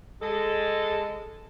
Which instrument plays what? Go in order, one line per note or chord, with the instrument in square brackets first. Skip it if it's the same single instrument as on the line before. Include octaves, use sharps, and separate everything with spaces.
[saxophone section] G#3 A4